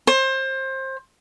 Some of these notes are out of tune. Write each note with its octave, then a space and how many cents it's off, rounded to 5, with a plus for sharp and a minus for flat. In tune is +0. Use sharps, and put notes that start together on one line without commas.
C5 +25